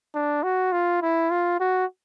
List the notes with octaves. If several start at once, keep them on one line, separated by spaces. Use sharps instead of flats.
D4
F#4
F4
E4
F4
F#4